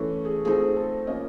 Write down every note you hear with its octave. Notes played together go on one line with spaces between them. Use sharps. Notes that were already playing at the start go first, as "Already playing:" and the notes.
Already playing: E3 A3 C#4
G#4
F3 A3 C4 D#4 G#4
A4
F3 A#3 C#4 D#5